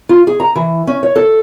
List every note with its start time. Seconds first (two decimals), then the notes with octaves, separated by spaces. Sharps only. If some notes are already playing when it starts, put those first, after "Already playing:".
0.09 F4
0.27 G#4
0.40 A#5
0.55 E3
0.87 C#4
1.03 C#5
1.16 A4